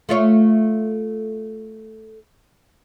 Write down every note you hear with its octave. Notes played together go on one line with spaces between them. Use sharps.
A3 F4 C#5